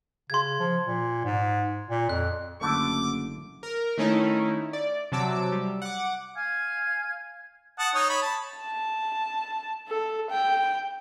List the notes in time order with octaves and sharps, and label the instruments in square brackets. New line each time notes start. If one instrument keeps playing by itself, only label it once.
[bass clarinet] C#3 [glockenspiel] C6 G#6
[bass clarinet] F3
A#2
G#2
A#2
[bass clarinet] F2 [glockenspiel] F#6
[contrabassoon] F#1 [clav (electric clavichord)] D3 A3 [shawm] D6
[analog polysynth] A#4
D#3 A3 C#4 D#4 E4
D5
C3 F#3 A5 D6 E6
G3
F#5 D6
[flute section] F5 G#5 F6 G#6
[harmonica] F#5 A5 D#6
D#4 C#5 D#6
C#5 B5
A5
[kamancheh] A5
A4
G5